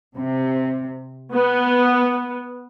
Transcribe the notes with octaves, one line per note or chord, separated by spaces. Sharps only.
C3
B3